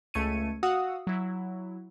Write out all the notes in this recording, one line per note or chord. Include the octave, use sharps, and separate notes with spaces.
C#2 A3 G#6 C#7 D#7
F#4 F5 F#5 D#6 E6
F#3 E4